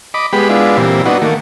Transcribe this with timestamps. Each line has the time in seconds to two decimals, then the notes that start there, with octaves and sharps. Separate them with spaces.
0.14 D#5 B5 D6
0.33 G#3 B3 G4 B5
0.49 G#3 B3 D4 E4 F4
0.77 A#2 E3 G3 C4
1.06 B3 D4 D#4 F#4
1.22 D#3 A3 A#3